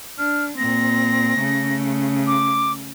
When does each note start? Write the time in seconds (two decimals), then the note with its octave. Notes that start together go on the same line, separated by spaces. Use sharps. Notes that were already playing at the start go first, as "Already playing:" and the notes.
0.19 D4 F6
0.58 A#2 C4 A#6
1.39 C#3 A3
2.27 D6